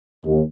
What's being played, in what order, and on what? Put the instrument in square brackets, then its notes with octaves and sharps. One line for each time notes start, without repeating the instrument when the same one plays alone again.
[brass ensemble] D#2